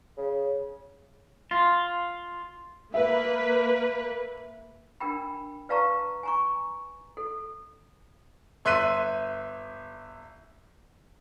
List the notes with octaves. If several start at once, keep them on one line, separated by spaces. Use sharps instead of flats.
C#3
F4
A#3 B4 E5
D4 A#4 G5 B5
B4 D5 F5 A5 A#5 C#6
G#5 A#5 C#6
A4
G1 E5 C6 F#6 B6 D#7